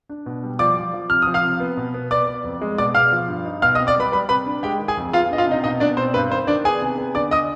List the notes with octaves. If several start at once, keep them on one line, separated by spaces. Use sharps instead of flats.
D4
B2
G3
F3 D5 D6
F3
F3
C3 F6
F3 D#6
F5 F6
C3
B3
B2
B3
B3 D5 D6
B3
F2
G#3
B2 D5 D6
B2 F5 F6
F3
G2
D#4
B2 F5 F6
D#5 D#6
C4
D5 D6
G3 B4 B5
G3 B4 B5
C3 B4 B5
D4
G#3 G4 G5
D#3
G#4 G#5
F2
B3 F4 F5
D4 D#5
F4 F5
C3 D#4 D#5
B2 D#4 D#5
B2 D4 D5
C4 C5
G2 B4
D#3 C5
D#3 D4 D5
B3 G#4 G#5
C3
B3
D3 D5 D6
D#5 D#6